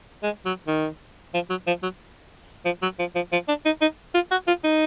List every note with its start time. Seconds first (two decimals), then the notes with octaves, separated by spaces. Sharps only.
0.23 G#3
0.45 F#3
0.67 D#3
1.34 F3
1.50 F#3
1.67 F3
1.83 F#3
2.65 F3
2.82 F#3
2.99 F3
3.15 F3
3.32 F3
3.48 D4
3.65 D#4
3.81 D#4
4.14 F4
4.31 F#4
4.47 F4
4.64 D#4